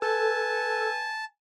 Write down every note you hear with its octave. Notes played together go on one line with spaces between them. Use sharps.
A4 B4 G#5 A5